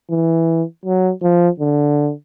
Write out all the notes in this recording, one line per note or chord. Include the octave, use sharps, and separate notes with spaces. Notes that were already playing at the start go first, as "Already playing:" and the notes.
E3
F#3
F3
D3